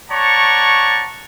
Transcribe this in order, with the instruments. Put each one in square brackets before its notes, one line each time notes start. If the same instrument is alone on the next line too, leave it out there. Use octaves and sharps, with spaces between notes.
[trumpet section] C#5 D5 F#5 A5 A#5 C#6